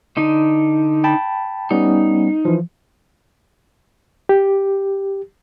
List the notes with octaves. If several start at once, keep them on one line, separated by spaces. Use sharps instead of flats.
D3 D#4
G5 A5 B5
G3 B3 C#4 D#4
E3 F3
G4